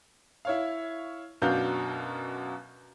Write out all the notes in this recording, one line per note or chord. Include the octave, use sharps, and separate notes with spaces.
E4 C#5 F5
F#2 B2 D4 F#4 F5 G6